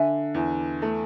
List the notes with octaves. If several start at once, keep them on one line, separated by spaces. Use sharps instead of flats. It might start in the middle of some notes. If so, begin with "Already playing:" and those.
Already playing: D3 E5 G#5
E2
A3